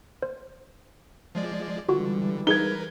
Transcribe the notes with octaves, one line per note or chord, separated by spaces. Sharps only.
C5
F3 G#3 D5
D3 E3 G3 G#3 F4 F#4
D#4 G#4 A#4 B4 G#6 G7